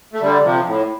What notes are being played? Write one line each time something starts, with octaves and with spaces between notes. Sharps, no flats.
A3
D3 G3
C3 F3
A2